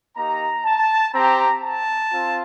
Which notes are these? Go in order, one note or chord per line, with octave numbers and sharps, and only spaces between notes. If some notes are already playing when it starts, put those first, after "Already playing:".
A#3 D#4 G4 A#5
A5
C4 G4 A#5
A5
C4 F4